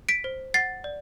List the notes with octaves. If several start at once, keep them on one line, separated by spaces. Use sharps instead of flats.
B6 D7
C5
F#5 A6 C7
D5